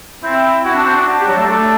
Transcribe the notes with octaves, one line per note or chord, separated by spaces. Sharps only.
C4 E4
E4 F#4
D4
C4
D4
D4
G4
F#3 F#4
A3 A4
A3 D4 A4